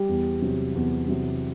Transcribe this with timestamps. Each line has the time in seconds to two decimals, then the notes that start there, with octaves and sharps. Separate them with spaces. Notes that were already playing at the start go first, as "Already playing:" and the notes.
Already playing: G3 G4
0.09 E2
0.42 C3 F#3
0.75 E2
1.08 C3 F#3